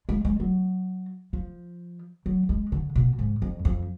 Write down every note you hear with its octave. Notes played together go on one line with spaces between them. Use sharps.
G#3
G#3
F#3
F3
F#3
G#3
D3
B2
G#2
F2
F2